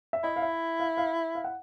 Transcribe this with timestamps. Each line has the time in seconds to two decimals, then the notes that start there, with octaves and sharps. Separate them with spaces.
0.13 E5
0.23 E4 D#5
0.36 F5
0.42 E5
0.80 F5
0.97 F5
1.35 F5
1.44 F#5